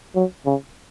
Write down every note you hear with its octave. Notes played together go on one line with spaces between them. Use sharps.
F#3
C#3